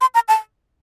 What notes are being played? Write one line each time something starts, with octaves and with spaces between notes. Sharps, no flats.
C6
A#5
A5